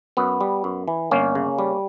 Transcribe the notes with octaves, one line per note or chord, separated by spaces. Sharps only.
F#2 B3
G3
F#2
E3
G1 A#3 C#4
C#3
G3